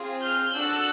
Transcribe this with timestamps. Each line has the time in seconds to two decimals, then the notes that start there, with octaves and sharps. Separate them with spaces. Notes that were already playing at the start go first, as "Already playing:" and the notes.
Already playing: C4 F4 G#4
0.21 F6 G6
0.53 D4 F#4 A4 E6 F#6